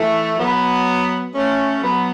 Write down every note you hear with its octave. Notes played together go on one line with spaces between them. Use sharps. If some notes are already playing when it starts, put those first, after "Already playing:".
Already playing: E3 A3
F#3 B3
A3 C#4
F#3 B3